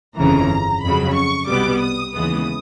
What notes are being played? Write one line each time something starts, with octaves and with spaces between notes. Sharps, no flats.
G1 F2 C#3 E3 A#5
F2 C#3 F#3 B5
C#6
C2 B2 G3 B3 D6
D#6
D#2 C#3 E3 G#3 B3 D#6